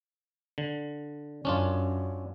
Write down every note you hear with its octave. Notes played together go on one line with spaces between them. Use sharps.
D3
F#2 C#4 D4 F4